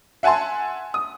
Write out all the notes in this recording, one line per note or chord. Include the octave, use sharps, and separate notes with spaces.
E5 F#5 G#5 A5 C6
D#6